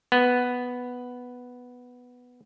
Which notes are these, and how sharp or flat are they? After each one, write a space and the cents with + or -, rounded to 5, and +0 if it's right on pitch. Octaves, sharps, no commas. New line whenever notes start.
B3 +0